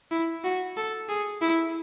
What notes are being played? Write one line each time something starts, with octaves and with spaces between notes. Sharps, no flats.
E4
F#4
A4
G#4
E4